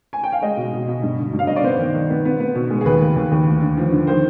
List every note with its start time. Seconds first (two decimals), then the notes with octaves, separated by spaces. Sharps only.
0.13 G#5
0.23 G5
0.32 F5
0.42 G#3 D#5
0.57 B2
0.73 B2
0.88 B2
1.02 G2
1.19 D3
1.33 G2
1.39 F5
1.47 G2 D#5
1.56 D5
1.64 B3 C5
1.79 D#3
1.94 D#3
2.10 B3
2.25 B3
2.40 B3
2.55 B2
2.70 G#3
2.81 G#4
2.85 D#2 B4
3.01 D#2
3.16 D#2
3.31 D#2
3.46 D2
3.62 D3
3.77 F3
3.92 D3
4.07 D#3 C5